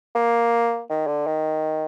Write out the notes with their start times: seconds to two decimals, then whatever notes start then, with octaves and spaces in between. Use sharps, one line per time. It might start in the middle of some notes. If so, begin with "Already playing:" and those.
0.15 A#3
0.90 D#3
1.07 D3
1.26 D#3